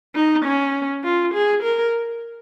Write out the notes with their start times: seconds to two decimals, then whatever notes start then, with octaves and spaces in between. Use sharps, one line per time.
0.15 D#4
0.45 C#4
1.04 F4
1.33 G#4
1.63 A#4